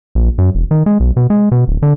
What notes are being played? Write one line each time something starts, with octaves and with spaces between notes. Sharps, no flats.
A#1
F#2
E1
D#3
G#3
B1
B2
G#3
B2
D1
D3